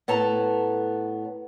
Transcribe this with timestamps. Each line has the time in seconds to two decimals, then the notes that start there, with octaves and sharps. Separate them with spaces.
0.08 A2 B3 A4 A5 A#5